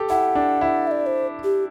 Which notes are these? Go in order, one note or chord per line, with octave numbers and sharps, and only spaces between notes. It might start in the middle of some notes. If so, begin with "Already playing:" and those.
Already playing: G4 A4
E4 F#5
D4
E4
E5
D5
C5
G4